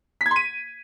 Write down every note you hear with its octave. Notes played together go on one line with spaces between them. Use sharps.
B6
G#6
C6
D#7